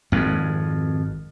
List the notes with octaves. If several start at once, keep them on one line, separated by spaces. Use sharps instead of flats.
G#1 F2